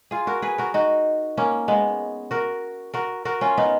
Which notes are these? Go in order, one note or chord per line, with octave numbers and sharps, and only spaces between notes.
F4 G#4
F#4 A#4
G#4 B4
F#4 A#4
D#4 F#4
A#3 C#4
G#3 B3
F#4 A#4
F#4 A#4
F#4 A#4
C#4 F4
B3 D#4